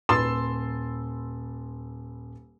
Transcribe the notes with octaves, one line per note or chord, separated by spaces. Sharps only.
D#1 B4 C6 E6 A6 E7